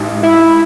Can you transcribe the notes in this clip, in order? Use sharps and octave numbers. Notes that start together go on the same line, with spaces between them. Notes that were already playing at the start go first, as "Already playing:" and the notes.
Already playing: A1 G#2
E4